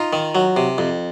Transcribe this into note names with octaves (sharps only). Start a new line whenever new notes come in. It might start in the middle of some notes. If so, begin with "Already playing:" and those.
Already playing: D#4 F4
D#3
F#3
C3
F2